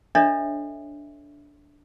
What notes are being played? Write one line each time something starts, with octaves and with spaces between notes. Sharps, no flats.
D4 A4 C#5 D#5 E5